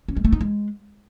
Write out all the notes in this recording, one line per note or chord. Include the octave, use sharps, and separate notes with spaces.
C#4
G#3
A3
D#4
G#3